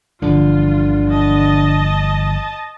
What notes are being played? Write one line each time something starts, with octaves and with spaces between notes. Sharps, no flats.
G1 D3 E3 F3 F4
D#5 A5